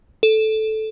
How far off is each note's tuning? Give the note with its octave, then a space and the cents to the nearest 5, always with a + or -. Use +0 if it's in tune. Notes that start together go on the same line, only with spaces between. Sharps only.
A4 -10